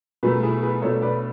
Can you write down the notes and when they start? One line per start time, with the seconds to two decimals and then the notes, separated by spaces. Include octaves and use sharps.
0.23 B2 F#3 A3 G#4 B4
0.43 E4 G#4
0.63 G#4 B4
0.82 B2 A3 D4 A4 C#5
1.02 B4 D5